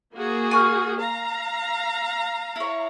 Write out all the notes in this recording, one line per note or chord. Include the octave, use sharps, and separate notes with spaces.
A#3 F#4 G#4
G#5 C#6 F6
F5 A#5
E4 C#5